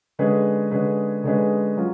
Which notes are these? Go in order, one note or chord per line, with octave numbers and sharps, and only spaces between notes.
D3 G#3 C#4 G#4 B4
D3 G#3 C#4 G#4 B4
D3 G#3 C#4 G#4 B4
F#3 C#4 F4